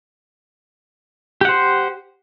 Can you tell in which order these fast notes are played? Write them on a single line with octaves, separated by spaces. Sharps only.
G4 F#5 C5